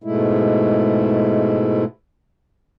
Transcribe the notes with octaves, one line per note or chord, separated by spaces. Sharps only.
G#2 B2 G#3 A3 E4